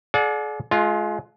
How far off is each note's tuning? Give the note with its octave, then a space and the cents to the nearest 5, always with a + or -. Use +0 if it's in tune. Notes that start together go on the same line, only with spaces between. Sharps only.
G#4 +45 D5 +0 F#5 -35
G#3 +35 F4 +0